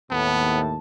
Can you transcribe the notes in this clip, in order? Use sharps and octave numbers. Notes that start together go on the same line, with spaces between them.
D#2 A2 B3 A5